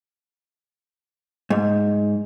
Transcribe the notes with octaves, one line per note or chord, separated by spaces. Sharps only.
G#2